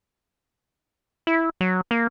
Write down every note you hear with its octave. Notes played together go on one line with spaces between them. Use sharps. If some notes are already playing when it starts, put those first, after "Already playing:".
E4
F#3
A#3